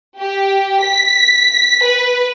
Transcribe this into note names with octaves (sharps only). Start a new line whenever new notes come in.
G4
B6
B4